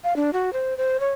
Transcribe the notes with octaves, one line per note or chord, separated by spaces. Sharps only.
F5
D4
F#4
C5
C5
C#5